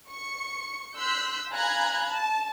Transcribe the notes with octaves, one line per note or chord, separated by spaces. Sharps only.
C#6 C#7
C6 E6 F#6 G6 B6
F5 G#5 A#5 B5 F#6 G#6
A5